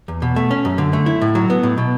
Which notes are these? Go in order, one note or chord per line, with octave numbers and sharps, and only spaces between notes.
E2
B2
A3
C#4
F#2
D3
A3
E4
A2
F#3
B3
A2
B2